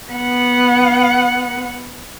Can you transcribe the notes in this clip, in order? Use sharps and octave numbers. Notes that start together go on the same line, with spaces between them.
B3 F#5